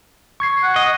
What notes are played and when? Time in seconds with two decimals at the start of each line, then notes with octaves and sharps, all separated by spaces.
0.40 C#6 G#6 C7
0.63 F#5
0.76 D#5